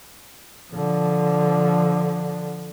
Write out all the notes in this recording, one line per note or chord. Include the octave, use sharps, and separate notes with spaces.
D3 F3